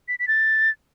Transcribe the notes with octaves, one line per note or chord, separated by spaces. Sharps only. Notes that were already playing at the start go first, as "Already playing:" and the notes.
B6
B6
A6